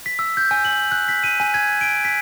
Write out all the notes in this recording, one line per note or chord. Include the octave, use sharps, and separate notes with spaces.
B6
E6
G6
G#5
F#7
F#6
B6
D#7
G#5
G#6
D7
B6